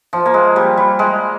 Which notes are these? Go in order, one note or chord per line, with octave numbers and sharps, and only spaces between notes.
F3
A#3
G#3
G3
G3
G#3